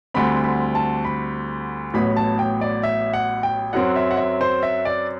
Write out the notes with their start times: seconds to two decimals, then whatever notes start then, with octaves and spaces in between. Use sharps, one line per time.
0.14 D2 D3 G3 C4 B5
0.44 B5
0.75 A5
1.05 B5
1.94 A1 A2 F#3 B3 B5
2.17 A5
2.39 G5
2.61 D5
2.83 E5
3.14 F#5
3.43 G5
3.73 F#2 F#3 C4 F#5
3.96 E5
4.11 F#5
4.17 E5
4.41 C5
4.63 E5
4.85 D5